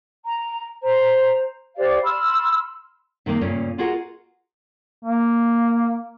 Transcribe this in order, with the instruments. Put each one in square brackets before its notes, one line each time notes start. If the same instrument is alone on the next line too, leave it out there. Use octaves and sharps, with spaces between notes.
[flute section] A#5
C5 A#5
G4 C5 D5 F5
B5 C6 E6 F6
[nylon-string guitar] C3 D#3 G#3 A#3
G2 A#2 C#3 A3 C#4
F4 F#4 G#4 A#4 D#5 F#5
[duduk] A#3